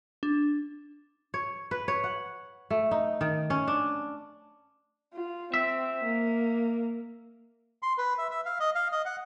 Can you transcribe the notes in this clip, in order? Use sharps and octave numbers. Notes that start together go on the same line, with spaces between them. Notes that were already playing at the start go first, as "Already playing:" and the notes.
D4
C#5
B4
C#5
F#5
A3
D#4
D#3
C#4
D4
F4
C4 E5
A#3
C6
B4
E5
E5
F5
D#5
F5
D#5
F#5